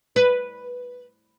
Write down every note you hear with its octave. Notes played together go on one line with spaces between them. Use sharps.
B4